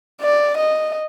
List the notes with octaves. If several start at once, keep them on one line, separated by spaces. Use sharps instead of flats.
D5
D#5